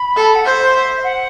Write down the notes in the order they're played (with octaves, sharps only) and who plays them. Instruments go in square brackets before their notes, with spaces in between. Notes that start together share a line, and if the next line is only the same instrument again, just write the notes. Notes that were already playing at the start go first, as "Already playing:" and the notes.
Already playing: [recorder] B5
[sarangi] A4
[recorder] F#5
[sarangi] C5 [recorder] E5
[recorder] F#5